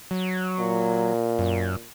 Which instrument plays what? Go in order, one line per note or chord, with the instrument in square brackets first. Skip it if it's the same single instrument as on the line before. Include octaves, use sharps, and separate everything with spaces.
[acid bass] F#3
[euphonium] A#2
[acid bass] F#2